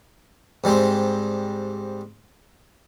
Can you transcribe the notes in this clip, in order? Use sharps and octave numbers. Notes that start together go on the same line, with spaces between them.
G#2 G3 G#3 C4